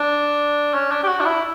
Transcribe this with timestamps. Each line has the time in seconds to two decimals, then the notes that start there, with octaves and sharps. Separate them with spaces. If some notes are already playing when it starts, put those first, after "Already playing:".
Already playing: D4
0.74 C#4
0.91 D4
1.03 G4
1.07 F#4
1.20 D4
1.25 E4